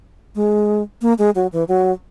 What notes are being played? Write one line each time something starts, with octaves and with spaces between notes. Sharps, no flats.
G#3
A#3
G#3
F#3
E3
F#3